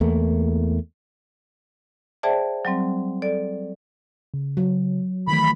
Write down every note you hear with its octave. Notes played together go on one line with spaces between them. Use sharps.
E2 A3 A#3
G#4 C5 D5 E5 G5 A5
F#3 G3 C4
A4 D5
C#3
F#3
D#3 E3 A3 B5